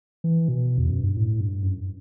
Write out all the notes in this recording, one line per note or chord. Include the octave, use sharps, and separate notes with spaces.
E3
B2
E2
F#2
G2
A2
G2
F#2